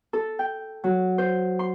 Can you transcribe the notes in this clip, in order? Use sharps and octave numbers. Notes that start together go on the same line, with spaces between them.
A4
G5
F#3
C5
C6